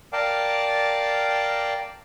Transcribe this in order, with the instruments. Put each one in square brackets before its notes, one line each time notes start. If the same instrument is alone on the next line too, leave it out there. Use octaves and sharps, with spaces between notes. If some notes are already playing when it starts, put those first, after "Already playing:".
[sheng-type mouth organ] A#4 D5 F5 G5 A5